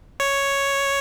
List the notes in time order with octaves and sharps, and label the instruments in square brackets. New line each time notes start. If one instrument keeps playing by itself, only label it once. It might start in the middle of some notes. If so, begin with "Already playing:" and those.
[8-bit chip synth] C#5